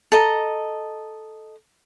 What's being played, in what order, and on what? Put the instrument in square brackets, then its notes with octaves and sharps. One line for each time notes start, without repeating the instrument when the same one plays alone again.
[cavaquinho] A4 D#5 A#5